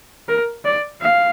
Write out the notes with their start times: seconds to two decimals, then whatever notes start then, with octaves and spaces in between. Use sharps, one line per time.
0.28 A#4
0.65 D5
1.01 F5